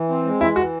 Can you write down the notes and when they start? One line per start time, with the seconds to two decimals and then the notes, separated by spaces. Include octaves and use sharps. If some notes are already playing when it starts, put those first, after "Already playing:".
Already playing: E3
0.09 C4
0.25 G#3
0.41 E3 E4
0.56 E3 F#4